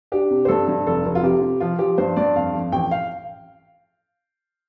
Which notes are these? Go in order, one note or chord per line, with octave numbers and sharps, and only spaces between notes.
D4 G4
C3
C5
G2 A4
G2
F1 A4
F1
F4
C3 G4
C3
F3 F4
F3 G4
G2 C5
G2 D5
F2 F5
F2
A1 G5
F5